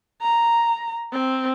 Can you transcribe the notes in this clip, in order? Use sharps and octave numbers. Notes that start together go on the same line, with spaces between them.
A#5
C4